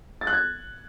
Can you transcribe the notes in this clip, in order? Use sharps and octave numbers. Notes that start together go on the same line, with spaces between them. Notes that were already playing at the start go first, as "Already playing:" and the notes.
A6
F#6
G#6